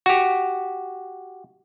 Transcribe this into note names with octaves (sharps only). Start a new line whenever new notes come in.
F#4 G4